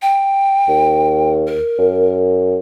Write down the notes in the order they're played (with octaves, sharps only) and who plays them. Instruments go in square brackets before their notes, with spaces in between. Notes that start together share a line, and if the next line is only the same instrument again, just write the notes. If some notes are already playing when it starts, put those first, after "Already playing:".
[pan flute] G5
[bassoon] D#2
[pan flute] A#4
[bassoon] F#2